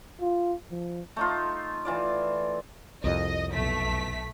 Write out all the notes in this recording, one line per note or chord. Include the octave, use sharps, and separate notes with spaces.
F4
F3
A3 D#4 F4
E3 F4 D5
C2 F2 D#5
B1 A3 B6